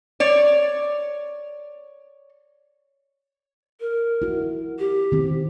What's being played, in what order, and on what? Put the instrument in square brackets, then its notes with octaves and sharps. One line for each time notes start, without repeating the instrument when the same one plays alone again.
[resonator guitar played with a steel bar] C#5 D5
[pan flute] A#4
[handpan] E4 F#4
[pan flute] G4
[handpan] D#3 C4